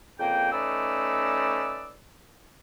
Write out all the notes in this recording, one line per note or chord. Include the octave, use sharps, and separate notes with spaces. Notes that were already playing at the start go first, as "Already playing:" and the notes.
F2 C#3 A#3 G5
A3 C#4 D#4 B4 D5 E6